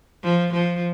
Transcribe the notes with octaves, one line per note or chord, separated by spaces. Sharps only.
F3
F3